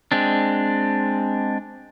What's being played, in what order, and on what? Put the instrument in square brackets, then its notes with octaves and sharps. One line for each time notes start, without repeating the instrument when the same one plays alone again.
[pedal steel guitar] G#3 C4 D4